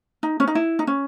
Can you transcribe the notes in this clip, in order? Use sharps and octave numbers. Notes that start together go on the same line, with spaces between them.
D#4
C#4
D#4
E4
D#4
C#4